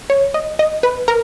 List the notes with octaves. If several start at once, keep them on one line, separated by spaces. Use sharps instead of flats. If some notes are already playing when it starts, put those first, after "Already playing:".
C#5
D#5
D#5
B4
A#4